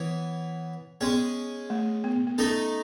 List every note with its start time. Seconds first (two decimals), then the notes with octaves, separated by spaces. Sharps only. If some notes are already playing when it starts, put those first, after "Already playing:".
Already playing: E3 B3 C#5
1.01 G#3 B3 C#4 G#4
1.70 A3
2.04 B3
2.27 B3
2.38 A3 C#4 D#4 A4 D#5